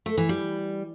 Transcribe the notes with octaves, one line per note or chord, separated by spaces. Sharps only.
A3
E3
G3